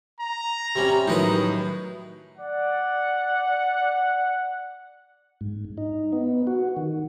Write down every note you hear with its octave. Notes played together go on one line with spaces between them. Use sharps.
A#5
C3 G3 C#4
A2 D#3 F#3 D#4 B4 D#6
D5 F#5
G#2
D#4
B3
F#4
D#3